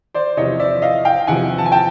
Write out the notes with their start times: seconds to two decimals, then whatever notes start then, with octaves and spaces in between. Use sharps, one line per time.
0.14 C5 D5
0.37 E2 C3 F3 C#5 D#5
0.60 D5 E5
0.82 D#5 F5
1.05 F5 G5
1.27 E2 C3 F3 F#5 G#5
1.58 A5
1.66 G#5
1.72 G5 A5